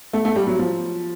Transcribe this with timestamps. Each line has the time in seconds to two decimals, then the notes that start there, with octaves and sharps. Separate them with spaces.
0.13 A3
0.25 A3
0.36 G3
0.47 F#3
0.59 F3